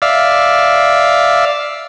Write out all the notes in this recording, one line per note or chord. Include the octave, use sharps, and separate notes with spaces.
D5 E5 F5